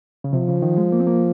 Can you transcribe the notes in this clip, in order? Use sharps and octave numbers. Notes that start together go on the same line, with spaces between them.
C#3
C3 F3
C#3
D#3
G#3
A#3
C4
A#3